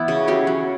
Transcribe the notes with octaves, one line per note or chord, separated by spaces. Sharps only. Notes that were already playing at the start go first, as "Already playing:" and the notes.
Already playing: E3 B3 E4
C#3
F#3 C#4 G4
F#3